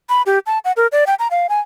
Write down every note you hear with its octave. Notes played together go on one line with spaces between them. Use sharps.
B5
G4
A5
F#5
A#4
D5
G5
A#5
F5
G#5